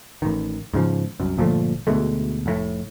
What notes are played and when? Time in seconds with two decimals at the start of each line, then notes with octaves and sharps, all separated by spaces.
0.22 A1 D#3
0.74 G#2 C#3 F3
1.20 C2 F#2
1.37 G1 A#2 F3 A3
1.87 D2 B2 G#3 A3
2.46 F1 A2